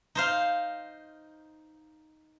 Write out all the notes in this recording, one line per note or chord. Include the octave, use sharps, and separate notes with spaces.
D#4 C5 F5